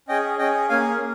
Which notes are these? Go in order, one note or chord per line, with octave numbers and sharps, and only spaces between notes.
C#4 G#4 D#5 G5
C#4 G#4 D#5 G5
A#3 C#4 G#4 F5 G#5
A#3